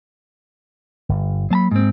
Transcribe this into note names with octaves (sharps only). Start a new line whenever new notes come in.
G1
F#3 A#3 A5 B5
G#2 C4